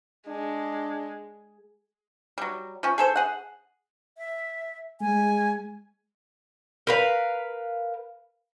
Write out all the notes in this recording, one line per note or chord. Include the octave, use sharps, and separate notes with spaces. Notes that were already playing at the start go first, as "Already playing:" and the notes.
G#3 D4
F#3 G3
F3 C#4
G#4 A4 C5
G#4 F#5
E5
G#3 G#5
A#4 B4 F5